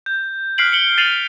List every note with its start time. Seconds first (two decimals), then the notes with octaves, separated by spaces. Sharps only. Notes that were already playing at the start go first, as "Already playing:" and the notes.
0.06 G6
0.58 F6 F#6 B6 C7 D7 F#7
0.72 C#7 F#7 G7
0.98 A6 C7 D#7 F7 F#7